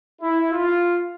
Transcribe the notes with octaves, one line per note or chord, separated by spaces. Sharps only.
E4
F4